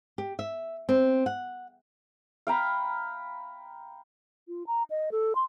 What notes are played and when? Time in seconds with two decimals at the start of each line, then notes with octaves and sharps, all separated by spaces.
0.18 G4
0.39 E5
0.89 C4
1.26 F#5
2.47 F5 G5 A#5 B5
4.48 F4
4.67 A#5
4.90 D#5
5.12 A4
5.35 C6